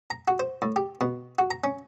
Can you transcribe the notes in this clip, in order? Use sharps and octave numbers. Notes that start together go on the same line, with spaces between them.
A#5
F#4
C5
A2
G4
B2
F#4
A#5
C#4